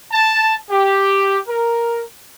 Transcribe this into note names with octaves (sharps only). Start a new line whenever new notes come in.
A5
G4
A#4